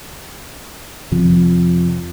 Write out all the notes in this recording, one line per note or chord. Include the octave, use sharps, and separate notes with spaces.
F2 C3 F3